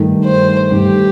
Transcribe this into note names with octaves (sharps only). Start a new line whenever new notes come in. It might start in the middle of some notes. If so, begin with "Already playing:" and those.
Already playing: G2 D#3 A3
C5
G2 D#3 A3 G4